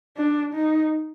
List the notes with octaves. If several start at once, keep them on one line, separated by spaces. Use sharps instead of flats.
D4
D#4